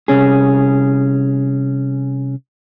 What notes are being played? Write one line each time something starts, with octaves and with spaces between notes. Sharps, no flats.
C2 C#4 G#4